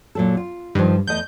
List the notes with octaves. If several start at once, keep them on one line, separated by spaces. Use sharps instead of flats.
A#2 F#3 A4
F4
G2 D#3 F3
E2 A3 D#5 G6